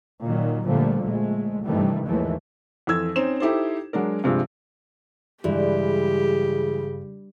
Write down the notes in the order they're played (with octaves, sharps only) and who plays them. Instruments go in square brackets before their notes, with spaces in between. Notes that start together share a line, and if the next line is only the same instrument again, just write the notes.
[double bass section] A#2 D#3 F#3
A#2 D3 F3 G3 A3
A#1 G#3 A3
G2 C3 D#3 E3 G3 A3
D#2 G#2 E3 F3 G#3 A3
[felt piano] F2 E3 A4 E6 G#6
C4 C#4 D#4 C5 E7
D#4 E4 G4 A4 C5
F#3 G#3 D4 A#4
G2 C3 F3 G#3
[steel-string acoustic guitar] G2 [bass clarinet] C#3 [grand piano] E3 G#3 [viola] G4